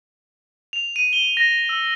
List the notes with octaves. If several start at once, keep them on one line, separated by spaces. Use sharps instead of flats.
F7
D#7
G7
A#6
E6